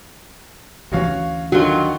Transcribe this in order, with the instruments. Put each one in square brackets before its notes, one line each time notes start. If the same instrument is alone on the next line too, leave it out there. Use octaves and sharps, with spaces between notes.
[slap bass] D2 E3 C#4 [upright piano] F#4 C#5 F5
[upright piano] D3 D#3 [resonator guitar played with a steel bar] F#3 F4 [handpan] F#4